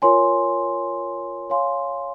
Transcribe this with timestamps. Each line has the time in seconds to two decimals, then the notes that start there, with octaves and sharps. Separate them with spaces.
0.02 F4 A#4 C#5 G#5 C6
1.50 C#5 F5 G#5 C6